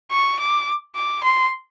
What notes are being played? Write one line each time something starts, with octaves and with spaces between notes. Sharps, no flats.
C#6
D6
D6
C6